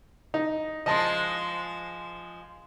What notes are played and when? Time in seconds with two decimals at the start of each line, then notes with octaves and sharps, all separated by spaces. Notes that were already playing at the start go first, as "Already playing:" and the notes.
0.34 D#4
0.86 F3 G#3 D#5 A5 C6